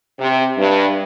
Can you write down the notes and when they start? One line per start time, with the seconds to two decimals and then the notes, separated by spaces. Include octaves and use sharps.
0.19 C3
0.58 G2